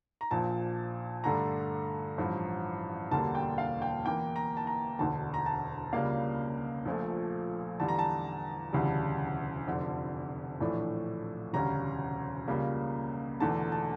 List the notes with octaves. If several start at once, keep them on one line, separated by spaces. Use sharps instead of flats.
A#5
A#1 A#2 F3 A5
G2 D3 A3 A#5
A1 G2 F3
E1 D2 D3 G3 A#3 A5
G5
F5
G5
E2 E3 A#3 G5
A#5
A5
A#5
E1 D2 D3 A5
A#5
A5
C#2 C#3 G3 A#3 D4 F5
A#1 A#2 F3 A3
E2 D3 G3 A5
A#5
A5
E1 D2 C#3 E3 G3
F1 F2 D3
A#1 A2 E3 A3 D4
E1 D2 C#3 G3 C#4 A#5
C#2 C#3 G3 A#3
E1 E2 D3 A3 A5
A5